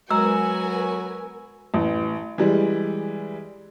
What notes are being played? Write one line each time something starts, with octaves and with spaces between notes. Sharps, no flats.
F#3 G#3 B3 F#4 A#4 G#5 A#5 E6
A1
E3 G3 G#3